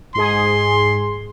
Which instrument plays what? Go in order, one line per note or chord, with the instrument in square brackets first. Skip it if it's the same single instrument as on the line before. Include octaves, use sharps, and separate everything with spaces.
[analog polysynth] G#2 G#4 [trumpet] C6